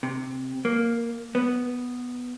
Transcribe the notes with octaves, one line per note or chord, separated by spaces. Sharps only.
C3
A#3
B3